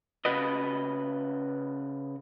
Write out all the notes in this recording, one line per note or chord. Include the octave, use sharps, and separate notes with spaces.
C#3 F#4 B4 D#5